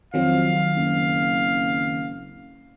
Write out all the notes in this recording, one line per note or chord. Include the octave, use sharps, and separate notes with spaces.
F2 D#3 F#3 C4 F5
F#1